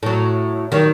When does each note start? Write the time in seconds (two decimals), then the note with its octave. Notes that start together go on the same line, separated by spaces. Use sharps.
0.03 A2 F#3
0.72 D#3 F#3 G3